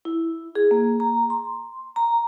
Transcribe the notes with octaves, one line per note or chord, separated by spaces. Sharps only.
E4
G#4
A#3
A#5
C6
A#5